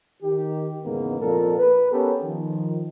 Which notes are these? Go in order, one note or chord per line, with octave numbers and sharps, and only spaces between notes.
D#3 G4
E2 G#2 C#3 A#3 B3
F2 A#2 A4 A#4
B4
B3 C#4 G4 A4 A#4
D#3 F3